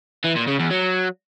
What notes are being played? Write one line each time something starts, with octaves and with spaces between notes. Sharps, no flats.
E3
A#2
C#3
E2
F#3